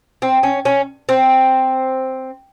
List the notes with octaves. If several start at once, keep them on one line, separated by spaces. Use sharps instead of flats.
C4
C#4
C#4
C4